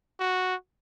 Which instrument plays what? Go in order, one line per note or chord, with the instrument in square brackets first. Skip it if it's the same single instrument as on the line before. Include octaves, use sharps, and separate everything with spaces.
[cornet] F#4